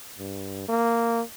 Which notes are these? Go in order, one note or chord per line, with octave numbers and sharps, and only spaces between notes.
G2
A#3